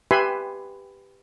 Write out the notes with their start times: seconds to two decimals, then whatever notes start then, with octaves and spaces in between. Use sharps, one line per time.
0.11 G4 B4 E5 G#5 B5 C6